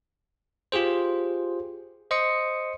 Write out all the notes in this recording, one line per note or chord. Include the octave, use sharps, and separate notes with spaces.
F4 G4 G#4 C5
C5 D#5 C6 D#6 C#7